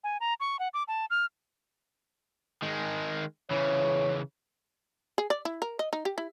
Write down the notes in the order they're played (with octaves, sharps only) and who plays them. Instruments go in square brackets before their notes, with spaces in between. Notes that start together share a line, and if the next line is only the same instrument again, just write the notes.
[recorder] G#5
A#5
C#6
F#5
D6
A5
F6
[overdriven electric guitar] D#3 G#3
[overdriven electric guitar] C#3 E3 [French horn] C#5
[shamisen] G#4
D5
E4
A#4
D#5
D#4
G4
E4